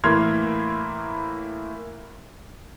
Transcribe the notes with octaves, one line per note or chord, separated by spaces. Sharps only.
A2 E3 A#3 C6 F6 G#6